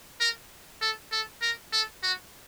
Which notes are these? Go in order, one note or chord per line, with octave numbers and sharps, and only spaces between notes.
A#4
A4
A4
A#4
A4
F#4